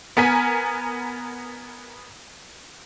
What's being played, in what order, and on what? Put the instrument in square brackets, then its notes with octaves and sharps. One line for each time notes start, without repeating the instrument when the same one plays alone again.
[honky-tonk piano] B3 A#4 G#5 B6